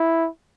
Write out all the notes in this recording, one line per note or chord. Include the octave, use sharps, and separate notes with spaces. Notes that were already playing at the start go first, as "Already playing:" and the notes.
Already playing: E4